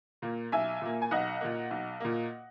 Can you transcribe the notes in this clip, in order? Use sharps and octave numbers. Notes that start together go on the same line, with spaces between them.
A#2 A#3
B1 E5 G#5
A#2 A#3
G#5
B1 D#5 F#5
A#2 A#3
B1
A#2 A#3